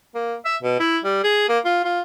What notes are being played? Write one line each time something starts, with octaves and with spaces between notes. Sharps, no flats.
A#3
E5
B2
E4
G3
G#4
A#3
F4
F4